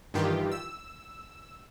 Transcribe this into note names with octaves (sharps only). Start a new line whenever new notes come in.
G2 D#3 E3 F4 G4
E6